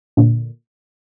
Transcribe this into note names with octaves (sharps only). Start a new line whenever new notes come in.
A#2 D3